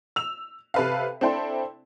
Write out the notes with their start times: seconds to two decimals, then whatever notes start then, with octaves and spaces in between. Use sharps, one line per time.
0.16 E6 F7
0.74 C3 A4 B4 E5 F5
1.21 C4 D4 E4 A4 G5 C6